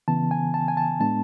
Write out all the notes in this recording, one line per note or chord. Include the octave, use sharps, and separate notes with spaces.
C#3 E3 B3 A5
G#5
A5
G#5
A5
A2 G#3 B3 D4 A5